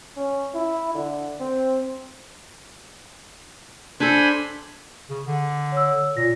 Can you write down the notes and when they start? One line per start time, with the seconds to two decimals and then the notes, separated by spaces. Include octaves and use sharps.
0.17 C#4
0.55 E4
0.95 D3
1.41 C4
4.00 D4 A4 C5 G#5 B5
5.10 C#3
5.27 D3
5.72 C#5 E6
6.17 A#2 A#6